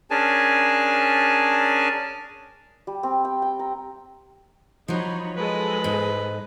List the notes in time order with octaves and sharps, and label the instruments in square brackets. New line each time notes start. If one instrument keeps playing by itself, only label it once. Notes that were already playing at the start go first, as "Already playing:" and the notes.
[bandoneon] C#4 D4 G#4 A#4 G#5 A5
[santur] G3
C4
G5
G5
A#5
[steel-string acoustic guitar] F3 F#3 [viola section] D#4 C#5 B5
[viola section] G#3 A4 D#5 [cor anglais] B4
[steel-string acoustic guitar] G#2